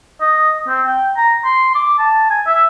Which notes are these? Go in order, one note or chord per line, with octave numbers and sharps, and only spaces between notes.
D#5
C4
G5
A#5
C6
D6
A5
G#5
E5